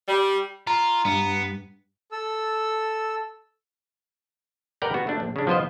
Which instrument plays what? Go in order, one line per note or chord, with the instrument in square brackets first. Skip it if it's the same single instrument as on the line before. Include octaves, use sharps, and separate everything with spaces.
[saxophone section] G3
[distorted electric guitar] F4 [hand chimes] A#5
[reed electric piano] G2 [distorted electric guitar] B3
[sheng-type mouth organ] A4 E6
[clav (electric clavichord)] A#4 B4 D5 F#5 G5 A#5
B3 F#4
A3 D4
A#1
C#3 D4
F3 B3 F4 C5 D#5